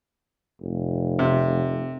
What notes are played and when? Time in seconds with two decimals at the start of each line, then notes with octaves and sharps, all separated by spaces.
0.60 F1
1.19 C3